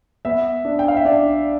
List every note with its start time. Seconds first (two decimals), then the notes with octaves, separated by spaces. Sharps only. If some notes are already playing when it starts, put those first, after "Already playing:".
0.25 B3 E5
0.65 D4
0.79 G5
0.88 F5
0.97 E5
1.05 D4 D5